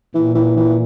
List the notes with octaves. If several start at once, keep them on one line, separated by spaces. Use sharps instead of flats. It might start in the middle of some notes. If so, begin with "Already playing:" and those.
A#2 E3
E3
E3